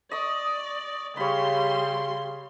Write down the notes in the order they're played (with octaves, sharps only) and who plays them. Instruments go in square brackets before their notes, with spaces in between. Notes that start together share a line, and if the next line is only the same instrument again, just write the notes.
[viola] D5 [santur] D#5 C#6 D#6
[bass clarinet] C#3 [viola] G3 C6 [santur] C#5 B5